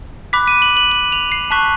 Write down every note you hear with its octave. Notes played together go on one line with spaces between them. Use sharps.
B5 D6 F#6 B6
D#7
F#7
F#7
F#7
F7
C7
A5 C#6 F#6 B6